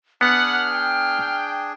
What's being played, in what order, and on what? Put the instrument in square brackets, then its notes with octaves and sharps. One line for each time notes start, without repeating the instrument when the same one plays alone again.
[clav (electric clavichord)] B3 [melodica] D4 G#4 [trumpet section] B4 F#5 [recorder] F6
[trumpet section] G5